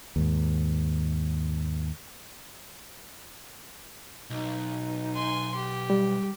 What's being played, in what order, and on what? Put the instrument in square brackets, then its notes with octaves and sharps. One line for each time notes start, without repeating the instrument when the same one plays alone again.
[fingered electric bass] D#2 G#2
[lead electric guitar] B1 [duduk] D#4
[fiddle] G#5 C6
G4
[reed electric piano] G3